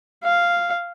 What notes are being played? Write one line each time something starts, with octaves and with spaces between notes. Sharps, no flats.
F5